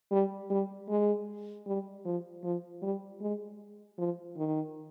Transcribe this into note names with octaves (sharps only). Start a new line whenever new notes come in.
G3
G3
G#3
G3
F3
F3
G3
G#3
F3
D#3